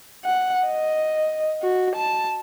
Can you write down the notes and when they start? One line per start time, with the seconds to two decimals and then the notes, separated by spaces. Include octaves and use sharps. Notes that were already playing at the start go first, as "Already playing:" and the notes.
0.24 F#5
0.67 D#5
1.62 F#4
1.96 A5